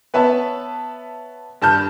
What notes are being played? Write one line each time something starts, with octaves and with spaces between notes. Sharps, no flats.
B3 B4 C#5 E5 A5
G2 A5 F6 G6